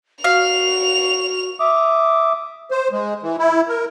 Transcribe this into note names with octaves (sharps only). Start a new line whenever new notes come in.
F#4 F5 F7
E5 D6 D#6
C5
G#3
E3
E4
A#4